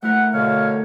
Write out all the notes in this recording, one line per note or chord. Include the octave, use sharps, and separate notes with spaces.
A3 E4 A#4 F#5
B2 D3 C#5 F5